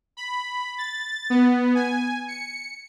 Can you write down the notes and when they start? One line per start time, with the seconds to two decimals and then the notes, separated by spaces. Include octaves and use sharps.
0.17 B5
0.78 A6
1.30 B3
1.75 G#5
2.28 C#7